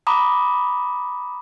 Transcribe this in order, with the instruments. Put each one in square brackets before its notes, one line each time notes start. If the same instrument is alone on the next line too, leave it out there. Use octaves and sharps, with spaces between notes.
[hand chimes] A#5 B5 D6 D#6